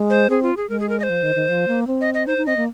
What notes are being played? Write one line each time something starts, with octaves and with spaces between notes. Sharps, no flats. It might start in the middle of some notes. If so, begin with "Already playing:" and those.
Already playing: G#3
C5
C4 G#4
F4
G#4
G#3 A#4
G#4
A#4
D#5
C5
F3
D#3
D#3
F3
A#3
C4
D#5
D#5
D#4 C5
D#4
C4 D#5
A#3